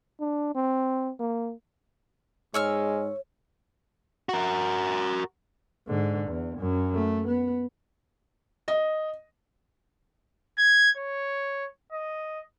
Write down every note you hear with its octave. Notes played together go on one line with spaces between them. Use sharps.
D4
C4
A#3
G#2 G#3 C#5 C#6 E6 F6
F#4 A#4
G#2 D3
E2
F#2
A3
B3
D#5
G#6
C#5
D#5